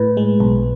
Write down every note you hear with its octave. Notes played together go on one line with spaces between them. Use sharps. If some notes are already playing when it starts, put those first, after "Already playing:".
Already playing: A2 B4
G#3
B1